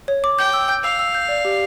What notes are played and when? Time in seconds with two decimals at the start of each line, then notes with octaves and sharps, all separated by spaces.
0.08 C#5
0.24 D6
0.38 G5 G6
0.53 E6
0.69 G6
0.84 F5 E6
0.99 E6
1.15 G6
1.29 D5
1.45 G4